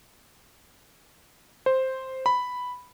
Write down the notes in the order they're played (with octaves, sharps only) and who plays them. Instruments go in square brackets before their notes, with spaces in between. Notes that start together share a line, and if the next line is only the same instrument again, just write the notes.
[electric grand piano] C5
B5